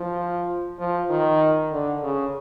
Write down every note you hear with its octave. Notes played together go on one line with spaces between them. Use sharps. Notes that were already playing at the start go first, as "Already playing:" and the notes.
Already playing: F3
F3
D#3
D3
C#3